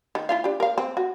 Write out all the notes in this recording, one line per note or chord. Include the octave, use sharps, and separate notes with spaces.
D#3
E4 F4 F5
D4 G4
A#4 F5
C4
F#4